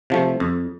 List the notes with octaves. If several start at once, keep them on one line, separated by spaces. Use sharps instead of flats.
C3 F3 A3
F2